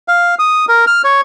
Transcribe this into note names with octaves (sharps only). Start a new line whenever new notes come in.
F5
D#6
A#4
F6
C#5